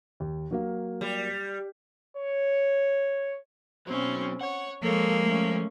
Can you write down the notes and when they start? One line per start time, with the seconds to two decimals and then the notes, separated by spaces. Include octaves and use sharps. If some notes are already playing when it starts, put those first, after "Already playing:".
0.20 D#2
0.51 F#3 A#3 F5
1.01 G3
2.17 C#5
3.87 B2 F#3 C4 C#4
4.41 C#5 F#5
4.83 F3 G#3 A#3 A4 C#5
5.24 A3 C#4